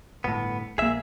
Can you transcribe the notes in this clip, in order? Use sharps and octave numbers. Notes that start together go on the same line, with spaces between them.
G1 A2 B3
A#1 A#3 G#4 E5